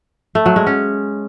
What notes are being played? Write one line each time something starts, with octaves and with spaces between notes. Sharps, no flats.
A3
F#3
G#3
C#4